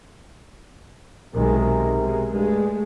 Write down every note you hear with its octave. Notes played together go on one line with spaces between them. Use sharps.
B1 C3 D#3 G#3 A#4
B2 G#3
G2 G#3 A3